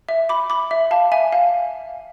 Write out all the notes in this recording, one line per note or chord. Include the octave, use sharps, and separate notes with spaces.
E5
B5 D6
B5 D6
E5
F5 A5
E5 G#5
F5